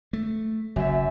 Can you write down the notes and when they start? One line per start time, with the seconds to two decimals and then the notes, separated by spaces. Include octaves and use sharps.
0.13 A3
0.76 F#1 F#2 E5